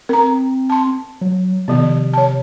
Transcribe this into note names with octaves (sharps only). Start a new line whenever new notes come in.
C4 A#4 A#5
A5 C6
F#3
C3 D#3 F3 B3
C#5 A5